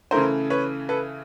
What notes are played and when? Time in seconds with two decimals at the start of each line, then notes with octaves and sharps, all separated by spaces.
0.11 C#3 E3 A3 A#4 C5
0.50 B4 C#5
0.89 A4 B4